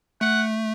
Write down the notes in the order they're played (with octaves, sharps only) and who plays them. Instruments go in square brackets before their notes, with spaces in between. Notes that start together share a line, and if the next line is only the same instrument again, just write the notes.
[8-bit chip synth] A3 [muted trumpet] F#5